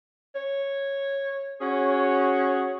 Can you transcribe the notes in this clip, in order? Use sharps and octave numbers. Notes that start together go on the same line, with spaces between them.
C#5
C#4 F#4 G#4 C#5